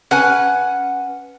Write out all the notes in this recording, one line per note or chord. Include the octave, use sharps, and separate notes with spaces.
C#4 B4 F#5 G#5